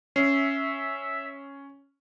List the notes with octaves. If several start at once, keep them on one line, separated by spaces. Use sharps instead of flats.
C#4 E5 C7